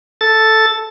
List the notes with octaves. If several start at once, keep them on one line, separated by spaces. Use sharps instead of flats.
A4 A6